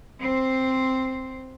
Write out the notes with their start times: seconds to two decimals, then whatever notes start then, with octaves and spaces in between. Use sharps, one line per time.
0.19 C4 C5